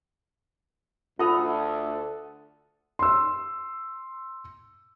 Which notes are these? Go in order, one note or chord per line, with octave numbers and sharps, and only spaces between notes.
D2 F4 A4 F#5 B5 D#6
C6 E6